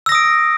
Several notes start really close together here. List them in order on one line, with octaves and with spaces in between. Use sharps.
E6 A#6 D#6 D7